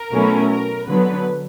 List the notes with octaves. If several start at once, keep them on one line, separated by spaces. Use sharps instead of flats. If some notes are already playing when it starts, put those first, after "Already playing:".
Already playing: A#4
B2 F#3 A3 C#4 E4
A#4
D3 F#3 B3 B4